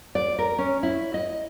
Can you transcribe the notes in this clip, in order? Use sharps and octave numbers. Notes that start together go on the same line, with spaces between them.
D5
A#4
C#4
E4
D#5